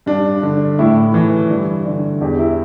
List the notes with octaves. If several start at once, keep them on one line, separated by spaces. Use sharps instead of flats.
G2 D4
D3
A2 E4
E3
G2
D3
E2 G4
E4